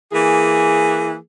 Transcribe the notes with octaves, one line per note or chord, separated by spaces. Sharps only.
E3 A#3 G#4